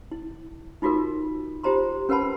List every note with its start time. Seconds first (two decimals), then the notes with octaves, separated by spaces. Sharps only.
0.11 E4
0.82 D#4 F4 F#4 A4 A#4
1.63 F4 G4 C5 A#5 C6
2.09 C#4 A#4 B4 F#5 A5 B5